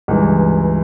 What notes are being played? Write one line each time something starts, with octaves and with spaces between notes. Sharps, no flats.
C#2 G2 E3